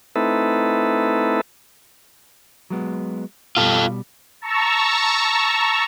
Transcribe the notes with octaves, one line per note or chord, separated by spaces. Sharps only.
A3 C4 D#4 E4 A4 B4
F#3 G#3 B3
B2 G3 F4 A4
A5 A#5 C#6 E6